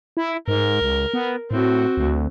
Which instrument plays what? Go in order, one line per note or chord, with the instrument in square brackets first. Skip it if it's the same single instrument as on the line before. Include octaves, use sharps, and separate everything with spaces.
[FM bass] E4
[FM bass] G#2 [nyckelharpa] A#4
[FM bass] C#2
B3
[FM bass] A2 [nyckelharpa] C4 F#4
[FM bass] D2